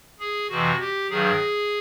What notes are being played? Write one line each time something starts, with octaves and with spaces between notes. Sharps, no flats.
G#4
F2 C3 E3 F#4
G4
G2 D#3 F#3 G#4